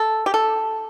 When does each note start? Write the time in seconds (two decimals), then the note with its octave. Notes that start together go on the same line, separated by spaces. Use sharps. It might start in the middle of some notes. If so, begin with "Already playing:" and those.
Already playing: A4
0.26 G4
0.34 A4